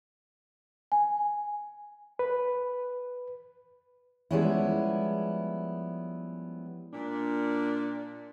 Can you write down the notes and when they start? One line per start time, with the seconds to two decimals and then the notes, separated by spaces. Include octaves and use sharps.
0.92 G#5
2.19 B4
4.31 F3 G3 G#3 B3 C#4 E4
6.93 A#2 D4